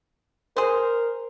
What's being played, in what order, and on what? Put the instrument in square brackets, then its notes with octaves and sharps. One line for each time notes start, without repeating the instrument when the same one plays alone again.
[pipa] G#4 C5 [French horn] A#4